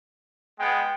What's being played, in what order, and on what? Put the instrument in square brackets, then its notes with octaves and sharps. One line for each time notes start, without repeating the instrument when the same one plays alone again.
[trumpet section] G#3 B3 [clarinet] G5